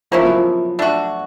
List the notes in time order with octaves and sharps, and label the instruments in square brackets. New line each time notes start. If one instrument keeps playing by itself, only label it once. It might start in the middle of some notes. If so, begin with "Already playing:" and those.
[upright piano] F3 [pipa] A#3 C#4 E4
[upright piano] F#3
F3
[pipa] A3 D4 F#4